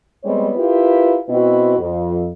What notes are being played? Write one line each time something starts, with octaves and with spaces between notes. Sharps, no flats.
G3 G#3 B3 C4 C#5
E4 F4 G4 A#4 B4
B2 C4 E4 F#4 B4
F2